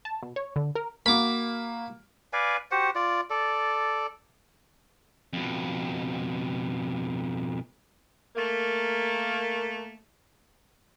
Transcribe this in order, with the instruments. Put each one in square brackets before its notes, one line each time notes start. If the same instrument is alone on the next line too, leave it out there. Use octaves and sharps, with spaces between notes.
[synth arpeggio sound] A5
B2
C#5
D3
A#4
[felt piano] A#3 F#4 [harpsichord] B5 D6
[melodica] B4 D5 F5 G#5
F#4 G4 C5 F#5
F4 D5
A4 D5
[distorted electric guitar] F2 B2
[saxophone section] A3 A#3